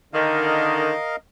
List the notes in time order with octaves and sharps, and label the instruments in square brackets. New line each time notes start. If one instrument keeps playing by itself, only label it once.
[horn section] D3 D#3 [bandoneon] A#4 D#5 F5